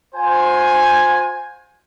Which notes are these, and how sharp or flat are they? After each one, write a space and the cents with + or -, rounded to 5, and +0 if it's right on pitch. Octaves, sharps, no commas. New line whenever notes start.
F4 +45 C5 +0 G#5 +0